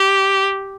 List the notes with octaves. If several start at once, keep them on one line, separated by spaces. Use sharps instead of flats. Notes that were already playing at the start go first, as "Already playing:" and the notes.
Already playing: G4